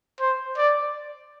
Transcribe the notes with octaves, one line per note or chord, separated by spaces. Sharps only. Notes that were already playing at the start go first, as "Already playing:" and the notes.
C5
D5